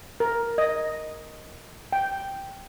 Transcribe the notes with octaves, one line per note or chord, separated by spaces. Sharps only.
A#4
D#5
G5